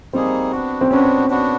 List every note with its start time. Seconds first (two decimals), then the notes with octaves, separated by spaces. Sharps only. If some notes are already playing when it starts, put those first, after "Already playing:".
0.13 G3 A#3 C4 D#4 G#4
0.52 B3 D4 F#4
0.81 C4
0.91 B3 C#4 D4 F#4
1.30 B3 D4 F#4